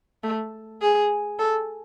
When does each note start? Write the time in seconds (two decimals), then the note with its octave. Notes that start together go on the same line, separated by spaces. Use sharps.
0.23 A3
0.82 G#4
1.39 A4